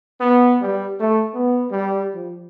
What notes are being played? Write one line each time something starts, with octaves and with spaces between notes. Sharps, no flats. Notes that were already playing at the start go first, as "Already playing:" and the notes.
B3
G3
A3
B3
G3
F3